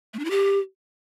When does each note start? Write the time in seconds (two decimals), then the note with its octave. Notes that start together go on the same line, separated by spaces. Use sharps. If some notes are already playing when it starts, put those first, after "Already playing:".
0.14 A3
0.19 D4
0.25 E4
0.31 G4